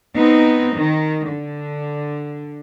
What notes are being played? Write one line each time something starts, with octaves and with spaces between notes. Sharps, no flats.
B3 C4 D#4
D#3
D3